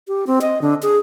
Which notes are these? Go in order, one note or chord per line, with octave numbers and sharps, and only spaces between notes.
G4
C4
D#5
D3
G#4